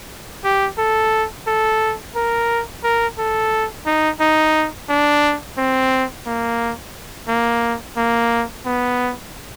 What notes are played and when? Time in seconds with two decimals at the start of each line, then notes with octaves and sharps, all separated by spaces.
0.44 G4
0.78 A4
1.47 A4
2.15 A#4
2.84 A#4
3.18 A4
3.86 D#4
4.20 D#4
4.89 D4
5.58 C4
6.26 A#3
7.28 A#3
7.97 A#3
8.66 B3